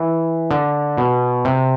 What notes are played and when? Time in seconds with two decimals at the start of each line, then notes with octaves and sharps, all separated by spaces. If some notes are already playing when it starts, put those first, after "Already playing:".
Already playing: E3
0.51 D3
0.97 B2
1.45 C3